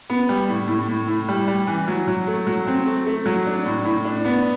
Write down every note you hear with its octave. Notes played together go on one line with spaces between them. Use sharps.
B3
G3
A2
A2
A2
A2
G3
G3
E3
F#3
F#3
A3
F#3
C4
A3
A3
F#3
D4
A2
A2
D4
B3